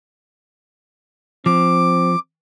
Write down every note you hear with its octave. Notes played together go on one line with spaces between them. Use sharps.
F3 C4 D6